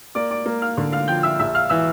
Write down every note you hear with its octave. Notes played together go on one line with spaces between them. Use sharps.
A#3 D5 D6
D5 D6
A#3
F5 F6
D3
F5 F6
F3 G5 G6
E5 E6
A#1 E5 E6
F5 F6
E3 E5 E6